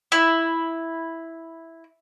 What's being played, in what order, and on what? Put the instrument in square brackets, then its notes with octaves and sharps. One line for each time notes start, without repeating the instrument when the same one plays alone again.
[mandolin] E4